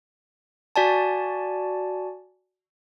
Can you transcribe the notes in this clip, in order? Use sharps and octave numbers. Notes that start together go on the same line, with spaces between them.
F#4 D5 G#5 A5